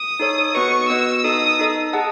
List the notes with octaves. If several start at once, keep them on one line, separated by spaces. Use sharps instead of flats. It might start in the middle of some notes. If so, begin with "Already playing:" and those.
Already playing: D#6
D#4 A4 C#5
B3 F#4 B4 D#5 C#6
B3 F#4 B4 D#5 E6
D#4 A4 D#5 D#6
D#4 A4 D#5
G#4 D#5 F#5 A5